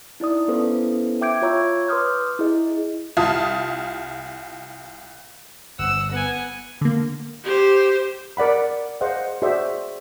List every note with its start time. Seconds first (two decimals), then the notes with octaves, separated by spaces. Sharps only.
0.20 D#4 E4 D5 D#6
0.48 B3 C#4 E4 A4 B4 C5
1.21 E5 G5 D6 G6 G#6 D7
1.42 F4 C#5 A#5 C#6 E6 G#6
1.88 B4 C6 D6 D#6 F6 G6
2.39 E4 G#4 D#5
3.17 C2 F4 A5 D#6
5.79 G1 F#5 E6
6.11 B3 F#5 G#5
6.81 D3 A#3
7.44 G4 C5
8.37 A#4 D5 F#5 B5
9.01 G#4 C5 D#5 F5 F#5
9.42 F#4 G#4 C5 D5 E5